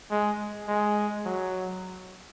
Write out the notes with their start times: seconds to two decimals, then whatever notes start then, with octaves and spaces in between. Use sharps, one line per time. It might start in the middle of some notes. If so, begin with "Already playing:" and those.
0.11 G#3
0.68 G#3
1.25 F#3